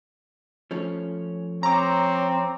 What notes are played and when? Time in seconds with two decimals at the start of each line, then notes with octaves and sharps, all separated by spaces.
0.71 F3 A3 C#4
1.63 C4 C#5 A#5 D6